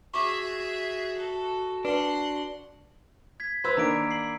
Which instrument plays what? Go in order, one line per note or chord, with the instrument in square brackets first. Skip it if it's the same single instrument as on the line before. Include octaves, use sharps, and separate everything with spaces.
[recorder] F#4 [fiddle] G#4 E5 [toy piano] C#6 D6
[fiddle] A4
[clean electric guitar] D4 [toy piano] B4 [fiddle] F#5 C6
[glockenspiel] G#6 B6
[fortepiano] B4 C5 [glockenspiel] B5 E6 G#6
[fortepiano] D#3 A#3 D4 [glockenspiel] A#5 D7
[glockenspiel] C7 F#7